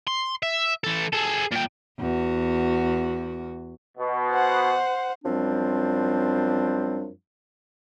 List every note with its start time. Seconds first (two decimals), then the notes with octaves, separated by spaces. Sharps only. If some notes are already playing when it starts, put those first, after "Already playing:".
0.08 C6
0.43 E5
0.84 E3 A4
1.13 G#4 A4
1.52 A#2 G5
1.99 E2 F#4
3.96 B2
4.32 C5 F#5
5.24 F#2 F3 G3 C4 D4